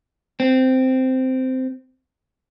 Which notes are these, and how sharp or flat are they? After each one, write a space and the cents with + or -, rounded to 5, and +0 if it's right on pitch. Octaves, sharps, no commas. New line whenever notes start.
C4 -10